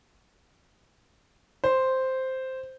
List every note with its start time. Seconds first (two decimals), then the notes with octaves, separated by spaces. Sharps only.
1.64 C5